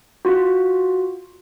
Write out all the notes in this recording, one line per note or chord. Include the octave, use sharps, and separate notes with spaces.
F4 F#4